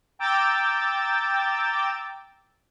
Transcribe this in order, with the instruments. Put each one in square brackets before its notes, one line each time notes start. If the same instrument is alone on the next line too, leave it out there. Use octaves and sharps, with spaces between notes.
[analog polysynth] G5 A#5 D6 E6 G6 A6